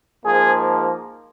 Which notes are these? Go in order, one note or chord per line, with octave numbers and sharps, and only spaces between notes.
G#2 F3 A#3 G#4